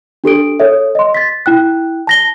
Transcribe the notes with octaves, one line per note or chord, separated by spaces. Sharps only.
D4 G4 A4 D7
A4 C#5 E5
D#5 C6
A6 B6
E4 G5 F#6
A5 A#6 G7